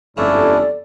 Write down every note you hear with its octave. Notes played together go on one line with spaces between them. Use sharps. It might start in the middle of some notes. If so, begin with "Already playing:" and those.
G1 F2 G#2 A3 C#4 D4 E4 D5